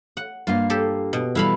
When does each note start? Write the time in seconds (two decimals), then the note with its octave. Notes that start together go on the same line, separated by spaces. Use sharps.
0.17 F#5
0.47 G2 A#3 F4 F5
0.70 G4 A4
1.13 B2
1.35 E3 G3 E4 A4 F5 B5